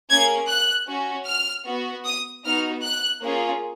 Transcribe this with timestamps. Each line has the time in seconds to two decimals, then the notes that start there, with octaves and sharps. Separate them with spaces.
0.11 A#3 C#4 G#4 G#6
0.49 F#6
0.89 C#4 F#4
1.27 F6
1.67 B3 F#4
2.05 D#6
2.45 B3 D#4 F#4 F6
2.84 F#6
3.22 A#3 C#4 F4 G#4